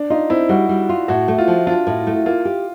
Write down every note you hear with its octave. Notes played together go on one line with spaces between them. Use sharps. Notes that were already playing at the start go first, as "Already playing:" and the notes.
Already playing: D4
D#4 F4
C4 E4
G3 F#4
G3
F4
A2 F#4
A3
F4
F3
D4 F4
A2
A3
A#3 F4
G4